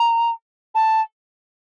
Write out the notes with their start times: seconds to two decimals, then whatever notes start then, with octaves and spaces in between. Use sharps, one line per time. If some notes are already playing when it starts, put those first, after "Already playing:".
Already playing: A#5
0.75 A5